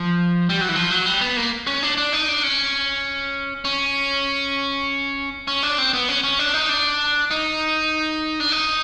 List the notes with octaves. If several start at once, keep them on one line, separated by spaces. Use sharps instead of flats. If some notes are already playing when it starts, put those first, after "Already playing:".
Already playing: F3
G3
F#3
E3
F3
F#3
G3
B3
A#3
C#4
D4
D4
D#4
D4
C#4
C#4
C#4
D4
C4
B3
C#4
C#4
D4
D#4
D4
D#4
D4
D#4